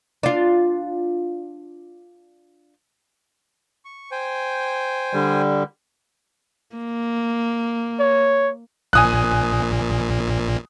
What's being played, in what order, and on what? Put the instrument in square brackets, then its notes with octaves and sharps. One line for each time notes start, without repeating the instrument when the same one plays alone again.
[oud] D4 F4
[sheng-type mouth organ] C#6
C5 G5 G#5
[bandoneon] D3 G3
[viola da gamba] A#3
[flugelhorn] C#5
[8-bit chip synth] A#1 A#2 [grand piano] G#5 D#6 F#6